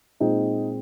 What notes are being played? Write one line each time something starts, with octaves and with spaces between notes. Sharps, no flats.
A#2 G#3 C4 D#4